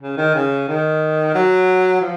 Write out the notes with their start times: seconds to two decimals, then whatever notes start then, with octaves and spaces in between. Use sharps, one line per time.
0.02 C#3
0.17 D#3
0.35 C#3
0.68 D#3
1.35 F#3
2.01 F3